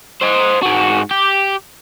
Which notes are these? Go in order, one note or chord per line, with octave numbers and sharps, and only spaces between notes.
C5 D#5
G#2 F#4
G4